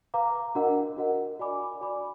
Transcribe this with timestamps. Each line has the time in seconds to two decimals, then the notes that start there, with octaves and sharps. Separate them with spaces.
0.14 B4 F5 A#5 D6
0.55 D4 F#4 A#4 D#5 F#5
0.97 D4 F#4 A#4 D#5 F#5
1.39 F#4 D5 G#5 B5 D6
1.81 F#4 D5 G#5 B5 D6